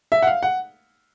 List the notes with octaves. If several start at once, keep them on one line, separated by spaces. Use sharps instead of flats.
E5
F#5
F5
F#5